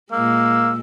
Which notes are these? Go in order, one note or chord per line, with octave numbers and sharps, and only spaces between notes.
A#2 G#3 A#3 E6